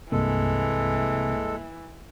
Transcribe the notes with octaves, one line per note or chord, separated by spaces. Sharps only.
C2 G2 C3 E3 G#3 A#3 A4